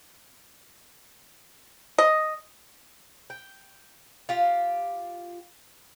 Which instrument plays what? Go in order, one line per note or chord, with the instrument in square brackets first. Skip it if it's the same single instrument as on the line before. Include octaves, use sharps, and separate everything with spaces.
[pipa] D#5
[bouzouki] G5
F4 G4